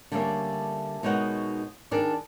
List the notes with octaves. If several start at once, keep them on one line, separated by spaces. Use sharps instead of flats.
D3 G3 A3 A#3 C#4 A4
B2 G#3 D#4 A#4 C#5 F#5
D#3 D4 D#4 G#4 A#4 D5